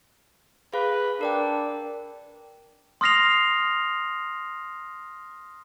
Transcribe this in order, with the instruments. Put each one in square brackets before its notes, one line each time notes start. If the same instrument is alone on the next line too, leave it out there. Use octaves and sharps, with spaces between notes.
[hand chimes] G#4 F5 [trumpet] B4
[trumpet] D4 [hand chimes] A#4 D5 G5
[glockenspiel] C6 D#6 F6 A#6 C7 F7